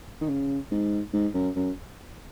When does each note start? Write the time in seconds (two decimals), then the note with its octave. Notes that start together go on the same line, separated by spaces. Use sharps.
0.21 D#3
0.29 C#3
0.71 G#2
1.13 G#2
1.34 F#2
1.56 F#2